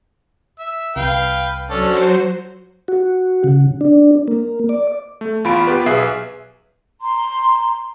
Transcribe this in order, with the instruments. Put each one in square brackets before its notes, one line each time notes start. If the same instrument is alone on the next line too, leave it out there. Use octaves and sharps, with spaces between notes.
[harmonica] E5
[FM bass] C2 [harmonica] B4 F5 G5
[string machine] F#3 F#4 C5 [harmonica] C#4 D4 A4
[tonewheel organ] F#4
C#3
D4
A#3
D5
[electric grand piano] A3
E2 F4 B5 D7
B3 G4 B4
B1 G#4 B4 E5 C7
[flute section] A#5 C6